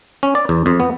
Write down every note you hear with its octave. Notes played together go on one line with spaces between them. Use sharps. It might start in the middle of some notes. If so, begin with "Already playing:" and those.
C#4
D5
E2
F2
B3